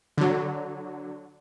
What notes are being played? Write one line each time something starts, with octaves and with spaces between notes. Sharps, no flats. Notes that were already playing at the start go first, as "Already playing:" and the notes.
D3 F#3